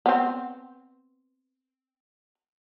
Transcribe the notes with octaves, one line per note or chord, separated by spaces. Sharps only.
B3 C4